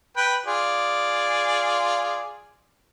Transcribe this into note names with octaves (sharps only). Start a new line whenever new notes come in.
B4 G5
F4 G#4 D5